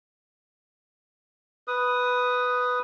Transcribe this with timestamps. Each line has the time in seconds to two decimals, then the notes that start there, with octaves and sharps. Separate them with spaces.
1.68 B4 D#6